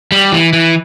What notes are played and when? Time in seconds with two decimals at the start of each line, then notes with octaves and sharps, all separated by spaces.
0.12 G3
0.32 E3
0.53 E3